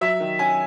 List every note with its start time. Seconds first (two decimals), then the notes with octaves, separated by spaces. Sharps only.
0.01 F#3 E5
0.20 D#3
0.39 C#4 G#5